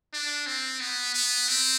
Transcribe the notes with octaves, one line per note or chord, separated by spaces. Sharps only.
D4
C4
B3
B3
C4